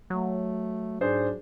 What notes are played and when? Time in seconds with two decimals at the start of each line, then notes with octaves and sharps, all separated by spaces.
0.10 F#3 A3
1.01 G#2 D4 G#4 C5